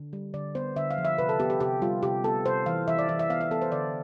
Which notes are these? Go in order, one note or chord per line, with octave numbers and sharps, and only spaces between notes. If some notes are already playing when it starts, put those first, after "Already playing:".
Already playing: D3
G3
D3 D5
B3 C5
D3 E5
F5
F3
E5
C3 B4
A4
B3 G4
G4
C3 G4
G3 F4
C3 G4
B3 A4
C3 C5
E3 F5
E3 E5
D5
E3 E5
E5
B3 F5
E5
B3 A4
C5
D3 D5